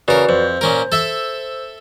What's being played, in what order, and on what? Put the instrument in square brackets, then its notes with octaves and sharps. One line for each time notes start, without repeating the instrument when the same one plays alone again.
[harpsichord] C#3 A#4 [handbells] F#4 B4 D5
[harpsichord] F2 [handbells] C5
[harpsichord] A#2 C#4 A#4
A4 E5